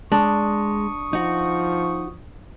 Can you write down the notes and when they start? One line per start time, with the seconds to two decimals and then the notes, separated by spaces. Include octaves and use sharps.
0.12 G#3 D4 C#6 D#6
1.13 F3 D#4 F#4